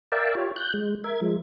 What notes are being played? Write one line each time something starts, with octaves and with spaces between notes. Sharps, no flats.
A#4 D5 E5 F5 G5 A5
F4 G4 C#5
F#6 G6
G#3
A#4 E5 G#6
F3 G#3